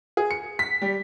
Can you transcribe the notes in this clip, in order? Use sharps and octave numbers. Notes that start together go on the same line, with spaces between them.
G#4
C#7
B6
G3